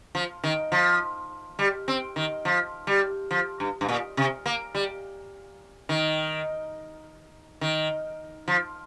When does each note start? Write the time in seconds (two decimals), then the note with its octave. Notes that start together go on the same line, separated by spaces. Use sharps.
0.15 F3
0.44 D#3
0.72 F3
1.59 G3
1.88 C4
2.16 D#3
2.45 F3
2.87 G3
3.31 F3
3.60 G2
3.81 G2
3.89 A#2
4.17 C3
4.46 A#3
4.75 G3
5.89 D#3
7.61 D#3
8.48 F3